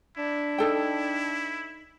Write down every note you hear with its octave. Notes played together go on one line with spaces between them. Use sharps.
D4 E4
D#4 A4 G5